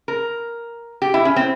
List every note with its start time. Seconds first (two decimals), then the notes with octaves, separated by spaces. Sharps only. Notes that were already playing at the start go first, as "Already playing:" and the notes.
0.08 A#4
1.02 G4
1.14 E4
1.25 C#4
1.36 C4